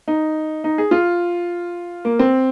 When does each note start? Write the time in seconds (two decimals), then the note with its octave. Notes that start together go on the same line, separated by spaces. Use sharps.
0.08 D#4
0.64 D#4
0.78 G#4
0.91 F4
2.05 A#3
2.19 C4